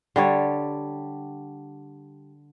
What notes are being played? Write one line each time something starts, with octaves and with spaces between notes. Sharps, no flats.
D3 G3 C#5